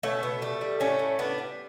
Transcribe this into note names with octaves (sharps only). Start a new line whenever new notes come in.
B2 A3 C#4
B2 B3
G3 A3
G3
A2 A3 C#4
A2
G3 B3 D4
G3